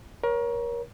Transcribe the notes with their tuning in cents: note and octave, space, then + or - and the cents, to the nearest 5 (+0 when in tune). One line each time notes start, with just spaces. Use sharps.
A#4 +30 C#5 +0